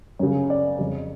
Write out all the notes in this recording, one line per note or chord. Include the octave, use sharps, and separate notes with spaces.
F#2 C#3 C#5
D5
F2 C#3